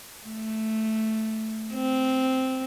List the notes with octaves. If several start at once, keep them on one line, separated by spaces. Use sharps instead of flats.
A3
C4